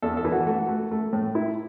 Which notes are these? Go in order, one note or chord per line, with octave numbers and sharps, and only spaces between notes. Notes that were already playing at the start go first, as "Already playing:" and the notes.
E2 A4
A4
E3
F#4
A3 F#4
A3
A3
A2
E4